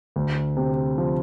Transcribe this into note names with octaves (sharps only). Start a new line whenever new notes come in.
D2
C3
F3